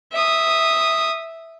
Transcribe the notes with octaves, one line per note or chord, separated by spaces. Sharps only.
E5 D#6